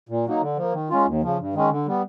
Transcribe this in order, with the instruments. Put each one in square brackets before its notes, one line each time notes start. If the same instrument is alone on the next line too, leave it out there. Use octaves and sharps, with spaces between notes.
[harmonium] A#2
F#3 A#3 D#4
D3
F3 A#3
D#3
G#3 C#4 F4
D#2
C#3 F3
G2
D#3 G#3 C#4
D3
G3 B3